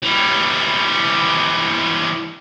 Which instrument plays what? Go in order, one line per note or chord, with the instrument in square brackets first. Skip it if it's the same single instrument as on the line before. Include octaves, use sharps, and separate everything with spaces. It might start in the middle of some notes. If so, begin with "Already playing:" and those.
[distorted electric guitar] E3 G3